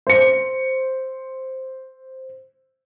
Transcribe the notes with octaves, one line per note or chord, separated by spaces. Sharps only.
C5 C#7